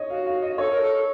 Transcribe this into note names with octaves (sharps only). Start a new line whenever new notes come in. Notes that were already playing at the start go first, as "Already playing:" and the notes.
Already playing: C#5 D#5
F#4 F5
F5
D#5
A4 C#5
A#4
A4